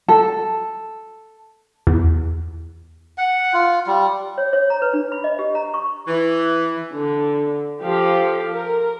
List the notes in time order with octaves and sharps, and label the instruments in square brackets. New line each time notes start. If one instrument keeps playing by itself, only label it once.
[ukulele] A4
[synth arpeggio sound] E2
[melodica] F#5
F4
G3
[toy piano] C#5
C#5
A#5
B4
D4
B5
D#5
G4
A#5
C#6
[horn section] E3
[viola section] D3
F3 G4 A4 F5
A#4